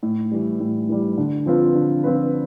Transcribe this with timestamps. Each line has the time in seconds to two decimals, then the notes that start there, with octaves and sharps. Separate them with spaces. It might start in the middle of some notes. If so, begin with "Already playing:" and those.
0.03 A2
0.31 E3 G3
0.60 A2
0.89 E3 G3
1.18 D3
1.46 F3 C4 F4 B4
1.75 D3
2.04 F3 C4 F4 B4